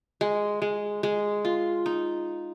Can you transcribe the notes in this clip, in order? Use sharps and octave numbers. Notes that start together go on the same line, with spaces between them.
G#3
G#3
G#3
F4
D#4